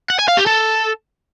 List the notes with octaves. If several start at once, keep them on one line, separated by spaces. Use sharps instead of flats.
F#5
G#5
F5
G4
A4